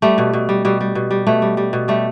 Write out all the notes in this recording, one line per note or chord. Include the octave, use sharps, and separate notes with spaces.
G3 A3
B2
B2
G3
B2 G3
G3
B2
G3
B2 A3
G3
G3
B2
G3 A3